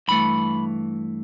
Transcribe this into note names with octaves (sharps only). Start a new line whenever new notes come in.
G2 E3 A3 B5